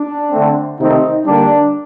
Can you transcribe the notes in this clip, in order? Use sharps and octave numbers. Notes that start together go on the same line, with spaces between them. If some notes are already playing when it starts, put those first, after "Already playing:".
Already playing: D4
D3 A3 C4
C3 D#3 A3 C4 D#4
D3 G3 A#3 D4